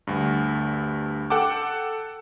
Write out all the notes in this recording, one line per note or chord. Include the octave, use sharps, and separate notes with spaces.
D2 G2
A4 F#5 G5 A5 D6